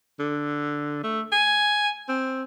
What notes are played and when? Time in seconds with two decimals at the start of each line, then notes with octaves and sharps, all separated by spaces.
0.19 D3
1.03 A3
1.32 G#5
2.09 C4